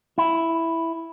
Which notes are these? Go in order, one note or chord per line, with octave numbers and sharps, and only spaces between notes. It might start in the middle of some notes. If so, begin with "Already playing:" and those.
E4